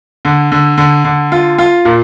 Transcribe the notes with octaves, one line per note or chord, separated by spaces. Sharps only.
D3
D3
D3
D3
F4
F4
A#2